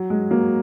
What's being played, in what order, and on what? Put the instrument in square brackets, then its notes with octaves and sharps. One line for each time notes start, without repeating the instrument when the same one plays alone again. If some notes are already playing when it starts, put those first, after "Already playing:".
Already playing: [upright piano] F#3
G#3
F#3 A#3